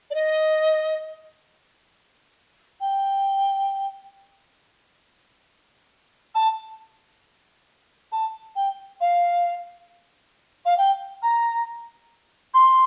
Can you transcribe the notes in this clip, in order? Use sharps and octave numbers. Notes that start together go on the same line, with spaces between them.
D5
D#5
G5
A5
A5
G5
F5
F5
G5
A#5
C6